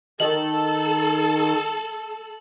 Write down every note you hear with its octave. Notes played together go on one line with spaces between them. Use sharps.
D#3 A4 F#7